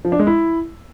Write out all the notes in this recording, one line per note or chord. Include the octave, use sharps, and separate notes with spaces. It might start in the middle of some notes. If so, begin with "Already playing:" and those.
F3
D4
G#3
E4